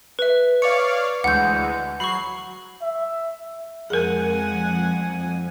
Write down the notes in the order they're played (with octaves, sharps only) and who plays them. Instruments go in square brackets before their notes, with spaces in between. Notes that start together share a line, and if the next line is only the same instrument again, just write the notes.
[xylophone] B4 E5
[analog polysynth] C#5 D5 F5 [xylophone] C#7
[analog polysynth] D2 E3 G#3 [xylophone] F#5 G6
[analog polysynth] F#3 C7 [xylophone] B5 C#6
[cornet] E5
[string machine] F2 [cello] F3 G#3 [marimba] G#4 A#4 [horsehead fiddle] F#5 G#5